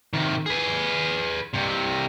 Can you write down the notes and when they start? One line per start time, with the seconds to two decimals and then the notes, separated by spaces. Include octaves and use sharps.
0.14 C3 D#3
0.46 G#4 B4
1.54 G2 C3